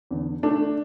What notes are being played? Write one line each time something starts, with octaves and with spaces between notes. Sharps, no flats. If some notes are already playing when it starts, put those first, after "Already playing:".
E2 D3
A3 D4